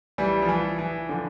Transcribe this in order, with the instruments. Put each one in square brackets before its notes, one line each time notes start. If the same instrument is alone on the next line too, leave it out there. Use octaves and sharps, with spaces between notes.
[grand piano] E3 G3
F3
E3
E3
D3 F3